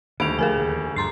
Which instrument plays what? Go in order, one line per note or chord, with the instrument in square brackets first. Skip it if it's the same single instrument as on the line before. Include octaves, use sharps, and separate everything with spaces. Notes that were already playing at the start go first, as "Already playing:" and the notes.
[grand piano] D#1 D2 D7 [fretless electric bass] D#3 [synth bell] B5 F7
[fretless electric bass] F3 A3 [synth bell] G#4 A#4 G#5
[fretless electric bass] D#2 D3
[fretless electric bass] G2 F3 [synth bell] A#5 C6 C7